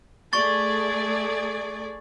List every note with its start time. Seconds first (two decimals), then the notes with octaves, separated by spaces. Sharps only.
0.33 A3 G#4 D5 C#6 A6